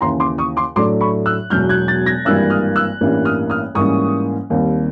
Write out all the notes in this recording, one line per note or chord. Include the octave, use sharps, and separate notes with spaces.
D#2 C#3 E3 A#5 C6
C6 D6
C#6 D#6
C6 D6
A2 F#3 A3 D4 C6 D6
B5 C#6
E6 F#6
E1 E2 B2 F#3 F6 G6
F#6 G#6
G6 A6
G#6 A#6
G#1 G2 E3 G3 A#3 E6 F#6
D#6 F6
E6 F#6
A1 G2 E3 G3 A#3
D#6 F6
D#6 F6
G#2 E3 G3 A#3 C#4 C#6 D#6
D#2 D#3 G3 C4